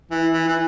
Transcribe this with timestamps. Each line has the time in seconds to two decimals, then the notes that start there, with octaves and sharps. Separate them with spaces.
0.11 E3
0.33 E3
0.47 E3